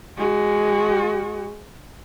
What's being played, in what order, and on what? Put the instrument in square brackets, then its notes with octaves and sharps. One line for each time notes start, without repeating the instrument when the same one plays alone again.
[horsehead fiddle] G#3 F#4